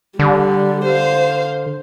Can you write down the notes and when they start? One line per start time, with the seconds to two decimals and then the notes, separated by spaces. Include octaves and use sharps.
0.19 D3 G3
0.85 C5 F5